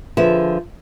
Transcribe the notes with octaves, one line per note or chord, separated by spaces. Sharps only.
D3 F3 G#4 B4 E5